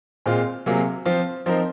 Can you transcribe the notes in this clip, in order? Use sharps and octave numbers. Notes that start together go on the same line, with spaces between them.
A#2 G#3 C4 F4
C3 F#3 A#3 F4 G#4
F3 C4 F4
F3 C4 D#4 A#4